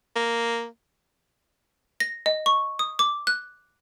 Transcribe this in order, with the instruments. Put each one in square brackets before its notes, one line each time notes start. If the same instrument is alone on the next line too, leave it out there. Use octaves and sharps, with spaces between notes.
[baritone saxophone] A#3
[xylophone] A#6
D#5
C#6
D#6
D6
F#6